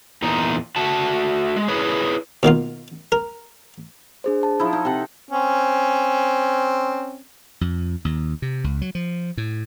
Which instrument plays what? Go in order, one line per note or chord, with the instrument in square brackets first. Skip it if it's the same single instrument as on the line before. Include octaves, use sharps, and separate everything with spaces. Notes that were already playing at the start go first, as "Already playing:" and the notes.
[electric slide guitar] E2 A#2 D#4
A3 F#4 A5
G#3
E4 G#4 B4 C#5
[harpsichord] B2 D#3 A#3 F4
A#4
[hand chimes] D4 G#4 C5
A5
[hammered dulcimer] F3 D#4 E4
D#4
C3 A4 F#5
[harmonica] C4 C#4
[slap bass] F2
D#2
C3
C#2
F#3
F3
A2